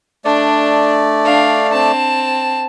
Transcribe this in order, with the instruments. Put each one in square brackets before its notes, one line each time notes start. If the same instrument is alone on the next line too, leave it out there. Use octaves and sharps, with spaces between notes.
[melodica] A3 D5 [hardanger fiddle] D4
[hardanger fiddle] D4 F5
C4 A5